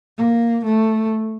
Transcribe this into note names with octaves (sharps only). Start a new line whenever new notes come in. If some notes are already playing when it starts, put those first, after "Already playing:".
A#3
A3